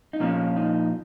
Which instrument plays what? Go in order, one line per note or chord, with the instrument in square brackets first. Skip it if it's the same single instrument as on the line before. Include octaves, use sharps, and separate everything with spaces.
[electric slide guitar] D#4
A#2 F3 A#3 C#4
D#4